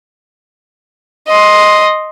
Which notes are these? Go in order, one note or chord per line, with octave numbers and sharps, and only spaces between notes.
D#5 C6